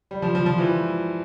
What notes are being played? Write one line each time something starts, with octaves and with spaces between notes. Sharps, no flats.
G3
F3
F3
F3
E3